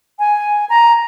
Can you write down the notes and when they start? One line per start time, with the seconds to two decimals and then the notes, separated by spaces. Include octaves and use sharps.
0.19 G#5
0.69 A#5